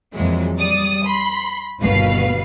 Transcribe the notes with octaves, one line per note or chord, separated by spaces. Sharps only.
F2 A#2 E3 F#3 G#3
G3 D5 D#6
B5 C6
G1 D#2 B2 B4 F5 C7